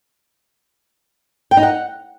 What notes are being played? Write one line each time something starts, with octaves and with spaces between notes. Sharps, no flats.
G5
D#4
F#5